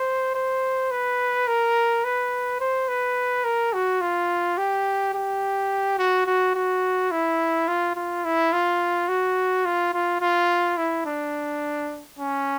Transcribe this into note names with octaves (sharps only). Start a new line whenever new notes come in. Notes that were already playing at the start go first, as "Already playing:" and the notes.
Already playing: C5
C5
B4
A#4
B4
C5
B4
A#4
F#4
F4
G4
G4
F#4
F#4
F#4
E4
F4
F4
E4
F4
F#4
F4
F4
F4
E4
D4
C#4